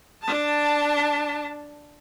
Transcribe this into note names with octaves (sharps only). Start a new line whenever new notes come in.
D4 A5